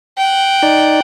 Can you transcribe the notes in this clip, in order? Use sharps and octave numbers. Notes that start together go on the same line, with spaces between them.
F#5 G5
D#4 D5